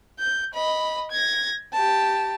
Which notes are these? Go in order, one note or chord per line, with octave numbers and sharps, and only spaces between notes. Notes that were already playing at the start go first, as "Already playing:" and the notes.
G6
D#5 B5
G#6 A#6
G4 A5